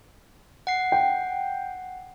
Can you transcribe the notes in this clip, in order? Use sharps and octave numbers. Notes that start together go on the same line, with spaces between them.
F#5 C7
G5